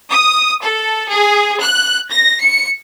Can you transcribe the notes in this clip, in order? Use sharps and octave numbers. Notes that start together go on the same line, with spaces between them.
D#6
A4
G#4
F#6
A#6
C#7